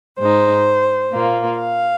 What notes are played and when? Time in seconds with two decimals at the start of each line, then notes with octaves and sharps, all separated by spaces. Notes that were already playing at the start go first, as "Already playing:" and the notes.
0.17 G#2 G#3 D#4 C5
1.12 A#2 A#3 F4
1.59 F5